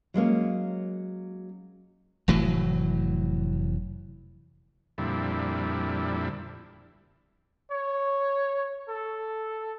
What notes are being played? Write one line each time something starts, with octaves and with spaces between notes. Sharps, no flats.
F#3 G#3 A#3 C#4
F1 A2 E3 F#3
F2 A#2 D3 G3 E4
C#5
A4